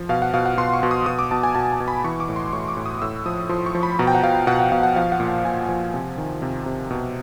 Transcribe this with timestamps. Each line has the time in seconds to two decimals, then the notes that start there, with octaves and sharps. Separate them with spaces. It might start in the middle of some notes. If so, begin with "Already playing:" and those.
Already playing: F3
0.09 B2 F5
0.22 F#5
0.34 B2 F5
0.46 F#5
0.57 B2 C6
0.74 C#6
0.83 B2
0.91 D#6
1.06 B2 D#6
1.19 D6
1.31 B2 A5
1.43 G#5
1.55 B2 A5
1.72 A5
1.80 B2
1.88 B5
2.04 E3 C#6
2.20 D6
2.29 A2
2.36 C6
2.53 A2 C#6
2.68 D6
2.77 A2
2.86 D#6
3.02 A2 E6
3.26 F3 D#6
3.49 F3 C6
3.66 C#6
3.75 F3
3.83 B5
3.99 B2 A#5
4.07 G5
4.15 F#5
4.23 B2 F5
4.47 B2 F#5
4.59 F#5
4.72 B2 F5
4.83 F#5
4.96 F3 F5
5.12 F#5
5.20 A#2
5.28 F#5
5.45 A#2 G#5
5.69 F3
5.94 C3
6.18 D#3
6.42 C3
6.66 C3
6.91 B2